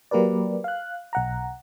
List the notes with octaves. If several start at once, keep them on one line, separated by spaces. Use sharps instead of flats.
F#3 A#3 G4 A#4 B4 D5
F5 F#6
B1 F#5 A#5